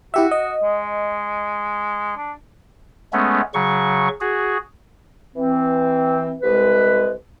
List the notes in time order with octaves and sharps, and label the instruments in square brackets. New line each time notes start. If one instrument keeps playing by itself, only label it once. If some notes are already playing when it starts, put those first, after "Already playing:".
[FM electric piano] E4 G4 E5 [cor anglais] F#4
[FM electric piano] D#5
[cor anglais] G#3
D4
[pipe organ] G#3 A3 B3 C#4
C#3 F#3 C#6
F#4 G#4
[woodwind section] E3 C4
C2 G#3 B4